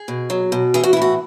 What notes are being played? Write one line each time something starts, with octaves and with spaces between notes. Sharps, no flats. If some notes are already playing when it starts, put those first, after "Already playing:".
Already playing: G#4
B2
F#3
B2
E3 G#4
F#4
E4
A2 F#4